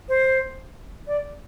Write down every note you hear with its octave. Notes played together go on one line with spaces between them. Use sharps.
C5
D5